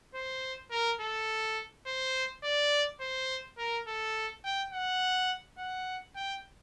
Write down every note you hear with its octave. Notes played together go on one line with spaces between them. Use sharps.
C5
A#4
A4
C5
D5
C5
A#4
A4
G5
F#5
F#5
G5